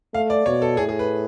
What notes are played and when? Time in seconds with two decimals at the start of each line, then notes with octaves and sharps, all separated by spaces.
0.14 A3 F5
0.30 D5
0.46 B2 C#5
0.62 A4
0.77 A2 G#4
0.89 G#4
0.99 B4